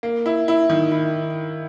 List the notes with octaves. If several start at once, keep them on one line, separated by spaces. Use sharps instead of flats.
A#3
E4
E4
D#3
E4